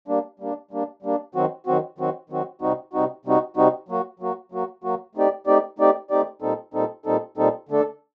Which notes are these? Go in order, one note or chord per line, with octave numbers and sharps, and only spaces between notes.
G3 A#3 D4
G3 A#3 D4
G3 A#3 D4
G3 A#3 D4
D#3 F#3 C4 F#4
D#3 F#3 C4 F#4
D#3 F#3 C4 F#4
D#3 F#3 C4 F#4
C3 G3 C4 D#4 F#4
C3 G3 C4 D#4 F#4
C3 G3 C4 D#4 F#4
C3 G3 C4 D#4 F#4
F#3 A#3 F#4
F#3 A#3 F#4
F#3 A#3 F#4
F#3 A#3 F#4
A3 C4 D#4 G4 D5
A3 C4 D#4 G4 D5
A3 C4 D#4 G4 D5
A3 C4 D#4 G4 D5
A#2 G3 C4 D#4 A4
A#2 G3 C4 D#4 A4
A#2 G3 C4 D#4 A4
A#2 G3 C4 D#4 A4
D3 A3 D4 A4